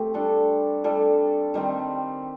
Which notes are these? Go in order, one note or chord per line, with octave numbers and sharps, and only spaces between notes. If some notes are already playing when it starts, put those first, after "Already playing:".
Already playing: A3 C4 G4
G3 D4 A4
G3 D4 A4
D#3 G3 C4